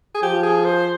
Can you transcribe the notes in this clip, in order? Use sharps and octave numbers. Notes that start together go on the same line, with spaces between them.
G#4
F3 G4
G#4
C5